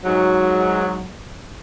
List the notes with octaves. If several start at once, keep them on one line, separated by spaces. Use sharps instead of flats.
G#2 F#3